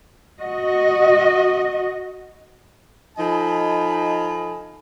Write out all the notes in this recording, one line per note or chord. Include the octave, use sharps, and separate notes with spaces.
F#4 D#5
F3 D#4 A4 D#5 G#5 B5